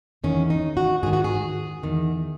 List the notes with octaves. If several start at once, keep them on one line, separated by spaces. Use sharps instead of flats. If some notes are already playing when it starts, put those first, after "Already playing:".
E2 D#3 C#4
D#4
F#4
G#2 D#3 G#4
F#4
G#4
E2 D#3